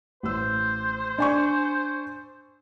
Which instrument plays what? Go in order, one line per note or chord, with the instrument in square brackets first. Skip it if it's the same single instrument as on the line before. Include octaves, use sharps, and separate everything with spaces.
[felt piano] A1 E6 [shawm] C5
[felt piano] D4 G#5 C#6